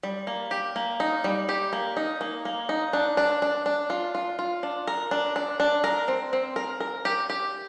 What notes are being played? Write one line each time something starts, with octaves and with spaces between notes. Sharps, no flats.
G3
A#3
G4
A#3
D#4
G3
G4
A#3
D#4
A#3
A#3
D#4
D4
D4
D4
D4
F4
F4
F4
D4
A#4
D4
D4
D4
A#4
C4
C4
A#4
A#4
G4
G4